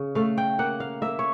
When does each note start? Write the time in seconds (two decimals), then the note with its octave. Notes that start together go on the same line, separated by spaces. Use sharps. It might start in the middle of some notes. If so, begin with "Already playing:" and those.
Already playing: C#3
0.15 A3 F5
0.38 G5
0.59 A#3 F#5
0.80 F5
1.02 A#3 E5
1.19 C#5